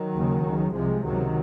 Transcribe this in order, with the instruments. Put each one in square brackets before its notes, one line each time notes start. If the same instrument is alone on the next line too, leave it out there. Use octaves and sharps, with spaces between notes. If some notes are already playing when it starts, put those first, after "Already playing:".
Already playing: [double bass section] D#3 F#3
D#2 C#3
C#2 C#3
C2 C3 F3 G#3
C#2 C3 D#3 F#3